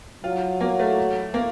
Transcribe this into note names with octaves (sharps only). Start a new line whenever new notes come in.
F#3 F4
F#3 A#3
A3
A#3